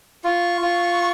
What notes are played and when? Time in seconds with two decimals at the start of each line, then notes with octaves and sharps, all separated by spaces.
0.24 F4 C#6
0.61 F4